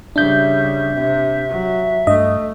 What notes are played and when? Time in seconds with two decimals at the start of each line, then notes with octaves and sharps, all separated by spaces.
0.16 C#3 G3 D4 E5 G6
0.93 C3
1.48 F#3
2.07 G2 A3 D#5